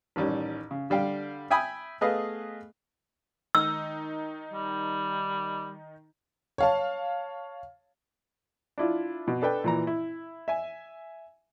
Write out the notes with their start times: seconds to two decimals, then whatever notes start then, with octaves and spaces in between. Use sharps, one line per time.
0.16 A1 D#3 G3 C#4
0.71 C#3
0.90 D3 G3 F5 G5
1.50 E5 G5 G#5 B5 D#6
2.01 A3 B3 G#4 B4 D#5 F5
3.55 D#3 D#4 D#6 E6
4.53 G3
6.58 C#5 F5 A5
8.78 D4 E4 F4
9.28 B2
9.42 D4 A4 B4 G5
9.64 A#2 E3 A#5
9.87 E4
10.48 E5 G#5